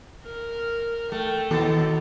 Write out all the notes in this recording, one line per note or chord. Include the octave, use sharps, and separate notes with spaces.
A#4
A3 G5
D#2 B2 A4